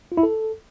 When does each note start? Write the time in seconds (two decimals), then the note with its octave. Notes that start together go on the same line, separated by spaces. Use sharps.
0.12 F4
0.17 E4
0.23 A4